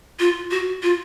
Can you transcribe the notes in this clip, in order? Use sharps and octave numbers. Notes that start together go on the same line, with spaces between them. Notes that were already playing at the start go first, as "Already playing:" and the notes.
F4
F#4
F4